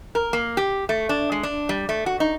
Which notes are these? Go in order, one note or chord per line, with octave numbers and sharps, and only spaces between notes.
A#4
A#3
G4
A3
D4
G#3
D4
G3
A3
F#4
D#4